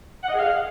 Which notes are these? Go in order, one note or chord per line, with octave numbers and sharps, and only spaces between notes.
F#5
D#5
G#4
F5